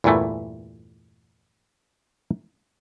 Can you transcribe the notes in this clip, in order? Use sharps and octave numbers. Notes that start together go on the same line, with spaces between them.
E2 G2 A#2 E3 A3